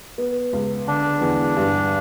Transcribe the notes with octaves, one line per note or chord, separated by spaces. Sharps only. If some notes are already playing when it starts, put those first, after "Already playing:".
B3
C#2
D3 D4
E2
G2